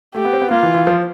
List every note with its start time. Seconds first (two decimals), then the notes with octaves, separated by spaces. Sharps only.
0.15 A3 G4
0.25 B3
0.33 C4
0.42 B3
0.51 A#3 F4
0.63 E3
0.74 E3
0.87 F3